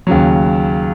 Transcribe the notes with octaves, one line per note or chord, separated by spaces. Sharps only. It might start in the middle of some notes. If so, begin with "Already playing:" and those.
D#2 C#3 F#3